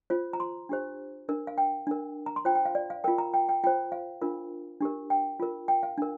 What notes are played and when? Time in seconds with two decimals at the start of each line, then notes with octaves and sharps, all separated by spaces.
0.10 F4 C5
0.33 A#5
0.40 C6
0.69 D4 G4 C5
1.28 D4 A#4
1.47 F5
1.58 G5
1.87 D4 A#4
2.26 A#5
2.36 C6
2.45 F4 C5 G5
2.55 G5
2.65 F5
2.75 D5
2.90 F5
3.04 F4 A#4 G5
3.18 A#5
3.34 G5
3.49 G5
3.64 F4 C5 G5
3.92 F5
4.21 D4 F4 A#4
4.81 D4 G4 A#4
5.10 G5
5.40 F4 A#4
5.68 G5
5.83 F5
5.98 D4 A#4